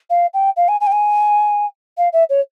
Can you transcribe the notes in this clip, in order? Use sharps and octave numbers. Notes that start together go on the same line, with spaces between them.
F5
G5
F5
G#5
G#5
G5
G#5
F5
E5
C#5